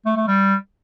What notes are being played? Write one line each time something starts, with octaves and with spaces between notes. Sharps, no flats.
A3
A3
G3